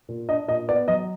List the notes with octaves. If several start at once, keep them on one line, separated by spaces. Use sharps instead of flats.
A#2
D4 D#5
A#2 D#5
B3 D5
F#3 D#5